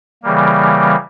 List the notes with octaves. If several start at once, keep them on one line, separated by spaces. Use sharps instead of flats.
C#3 E3 G3 A#3